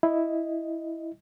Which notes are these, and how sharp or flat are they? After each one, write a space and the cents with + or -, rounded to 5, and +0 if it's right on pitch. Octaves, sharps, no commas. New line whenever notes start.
E4 +0 D#5 +0